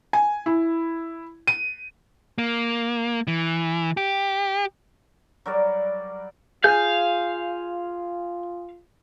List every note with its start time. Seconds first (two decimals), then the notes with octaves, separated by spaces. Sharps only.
0.13 G#5
0.46 E4
1.47 D#7
2.38 A#3
3.27 E3
3.97 G4
5.46 F#3 G3 A#4 D5
6.64 F4 G#4 F5 G#5 G6